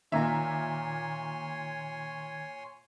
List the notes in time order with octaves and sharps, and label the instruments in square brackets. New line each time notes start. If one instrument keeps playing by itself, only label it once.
[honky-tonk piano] A#2 A#3 E5 [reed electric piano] D#3 A#5 [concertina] C#5 G#5 C6